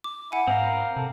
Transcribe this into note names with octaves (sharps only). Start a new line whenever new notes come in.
D6
E4 F#5 G#5
G#2 C4 A#4 F5 A#5
C3 A4